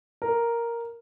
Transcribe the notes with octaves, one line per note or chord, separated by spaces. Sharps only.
A#4